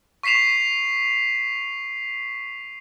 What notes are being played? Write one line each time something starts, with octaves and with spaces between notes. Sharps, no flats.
C#6 B6 C7 E7 F7